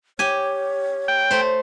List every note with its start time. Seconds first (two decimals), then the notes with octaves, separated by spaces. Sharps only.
0.19 G4 C#5 G#5
1.08 G5
1.31 A3 C5